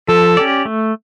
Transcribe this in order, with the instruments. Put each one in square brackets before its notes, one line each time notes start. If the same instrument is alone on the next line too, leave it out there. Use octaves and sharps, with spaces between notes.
[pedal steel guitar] F3 [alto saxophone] A4
[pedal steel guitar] C#4 G4 D5
A3